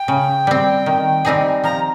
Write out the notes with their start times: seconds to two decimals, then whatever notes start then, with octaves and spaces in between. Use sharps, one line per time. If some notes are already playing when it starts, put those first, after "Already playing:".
Already playing: G5
0.08 C#3
0.47 G3 C4
0.86 D#3
1.25 G3 C4 D#4 G#4
1.64 F3 A#5